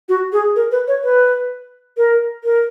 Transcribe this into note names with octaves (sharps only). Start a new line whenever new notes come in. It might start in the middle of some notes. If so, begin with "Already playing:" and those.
F#4
G#4
A#4
B4
C#5
B4
A#4
A#4